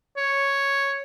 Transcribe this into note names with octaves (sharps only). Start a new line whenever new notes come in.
C#5